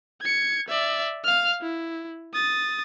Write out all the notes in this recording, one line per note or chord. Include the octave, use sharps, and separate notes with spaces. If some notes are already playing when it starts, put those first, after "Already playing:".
G#6 C#7
D5 E5
F5 F6
E4
D#6 A6